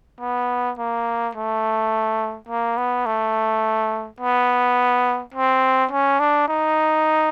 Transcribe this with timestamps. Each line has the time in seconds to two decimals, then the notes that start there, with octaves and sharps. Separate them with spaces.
0.21 B3
0.79 A#3
1.35 A3
2.49 A#3
2.78 B3
3.06 A3
4.20 B3
5.34 C4
5.91 C#4
6.20 D4
6.48 D#4